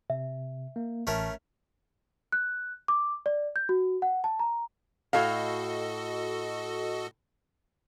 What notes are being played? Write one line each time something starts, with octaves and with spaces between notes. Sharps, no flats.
C3 E5
A#3
A1 A3 C#4 A#4 A5
F#6
D6
D5
G6
F#4
F#5
A5
A#5
A2 F#4 A4 D#5 F5